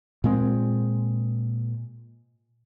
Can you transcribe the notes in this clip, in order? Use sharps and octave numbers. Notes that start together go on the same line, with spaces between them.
A#2 G#3 C4